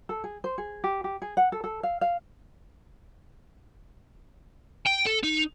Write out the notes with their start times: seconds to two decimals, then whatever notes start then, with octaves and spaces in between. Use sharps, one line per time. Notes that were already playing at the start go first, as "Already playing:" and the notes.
0.09 A4
0.24 G#4
0.44 C5
0.58 G#4
0.84 G4
1.04 G4
1.22 G#4
1.37 F#5
1.52 A4
1.64 A4
1.83 F5
2.01 F5
4.87 G5
5.07 A4
5.24 D#4